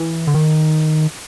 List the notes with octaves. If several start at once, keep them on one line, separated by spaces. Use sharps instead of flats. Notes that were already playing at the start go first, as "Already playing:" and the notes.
Already playing: E3
D3
D#3